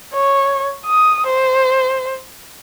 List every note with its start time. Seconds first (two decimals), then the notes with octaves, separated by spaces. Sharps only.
0.13 C#5
0.86 D#6
1.26 C5